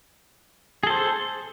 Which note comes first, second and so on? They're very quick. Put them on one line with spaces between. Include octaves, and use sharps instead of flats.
G#4 A4 C5